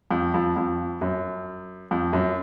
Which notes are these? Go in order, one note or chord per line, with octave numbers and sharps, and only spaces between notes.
F2
F2
F2
F#2
F2
F#2